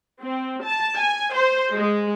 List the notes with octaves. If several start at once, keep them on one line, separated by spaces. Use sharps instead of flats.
C4
A5
G#5
C5
G#3